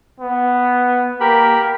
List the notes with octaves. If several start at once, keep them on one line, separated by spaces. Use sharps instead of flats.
B3
A#3 G4 A#4 B5